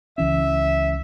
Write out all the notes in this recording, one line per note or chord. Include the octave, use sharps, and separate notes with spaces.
C#2 E3 C#4 E5